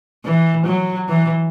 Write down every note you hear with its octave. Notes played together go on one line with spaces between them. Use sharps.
E3
F#3
E3